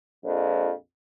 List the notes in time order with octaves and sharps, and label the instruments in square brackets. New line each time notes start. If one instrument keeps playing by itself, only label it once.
[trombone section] A#1 F2